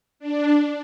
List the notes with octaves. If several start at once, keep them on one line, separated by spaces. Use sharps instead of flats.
D4